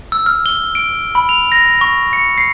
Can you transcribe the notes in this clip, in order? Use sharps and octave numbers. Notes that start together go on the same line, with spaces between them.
E6
F6
G7
D7
B5
F7
A#6
C#6
C#7
C7